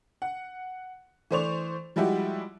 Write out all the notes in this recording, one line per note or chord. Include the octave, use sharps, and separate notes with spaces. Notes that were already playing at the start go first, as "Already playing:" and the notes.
F#5
E3 A3 C5 D5 C#6 F7
F3 G3 G#3 E4 F#4 G4